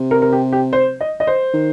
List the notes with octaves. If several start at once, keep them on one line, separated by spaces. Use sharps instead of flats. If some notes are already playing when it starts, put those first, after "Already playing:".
Already playing: C3
A#4
A#4
G4
G4
C5
D#5
D#5
C5
D#3